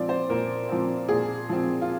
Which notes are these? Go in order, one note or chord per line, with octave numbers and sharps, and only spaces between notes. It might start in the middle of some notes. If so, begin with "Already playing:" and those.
Already playing: A#2 F3 C4 D5
C5
A#2 A#4
F3 C4
A#2 G#4
F3 C4
F4